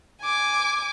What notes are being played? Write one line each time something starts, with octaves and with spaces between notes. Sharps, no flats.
G#5 D6